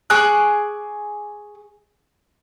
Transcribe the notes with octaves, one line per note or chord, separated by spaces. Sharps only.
G#4 C#6 D6 F#6